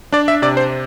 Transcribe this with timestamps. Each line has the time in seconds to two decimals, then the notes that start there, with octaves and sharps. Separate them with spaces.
0.12 D4 D5
0.28 E5
0.42 C3 D5
0.57 C5